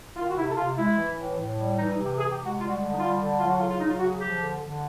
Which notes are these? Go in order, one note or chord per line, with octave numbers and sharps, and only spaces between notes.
D#3 F4
F#4
C3 E4
A4
C3 F4
G#3 E4
E3
A2
A2
G3
E3 D#4
D#4
C3
G4
C3 G#4
G4
G#3
F#4
G3 F4
F#4
D3
D#4
G3 F4
D3
F#3 F4
F#4
C#3 F4
F4
F#3 D#4
F4
C#3 F#4
G#4
F3 G4
D3
D3